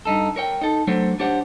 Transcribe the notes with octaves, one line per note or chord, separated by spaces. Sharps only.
G2 D#4 A4
A#4 C#5 G5
D#4 A4
F#3 A3 D4 C5 C#5
D4 G4 C5 C#5 F#5